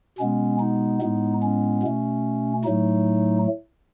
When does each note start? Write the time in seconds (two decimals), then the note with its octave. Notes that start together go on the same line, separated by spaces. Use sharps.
0.19 B2 G#3 B3 C#4
0.60 D#4
1.02 A2 G#3 B3
1.42 C#4
1.83 B2 A3
2.65 A2 F#3 A3 D#4